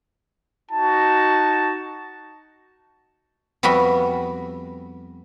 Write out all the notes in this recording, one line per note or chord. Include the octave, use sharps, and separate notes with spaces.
D#4 F#4 A5
F2 G3 B3 F#4 E5 B5